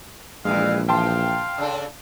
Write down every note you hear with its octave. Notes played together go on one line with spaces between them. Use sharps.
A#1 G2 E3 G#3 F5
E3 F5 G5 A5 C6
C#3 D4 A4